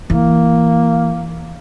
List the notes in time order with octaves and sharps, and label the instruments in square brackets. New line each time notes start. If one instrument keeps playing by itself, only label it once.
[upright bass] E3 [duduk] A#3